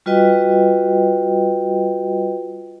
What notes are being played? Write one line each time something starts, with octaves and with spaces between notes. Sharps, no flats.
G3 F4 F#4 B4 D#5 G5